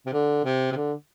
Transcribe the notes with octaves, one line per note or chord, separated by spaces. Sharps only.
C3
D3
C3
C3
D3